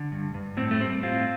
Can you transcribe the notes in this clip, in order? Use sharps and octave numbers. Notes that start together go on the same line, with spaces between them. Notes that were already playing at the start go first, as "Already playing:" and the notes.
Already playing: D3
G2
G2
A2 C4
A3
G3 C4
A2 C4 F4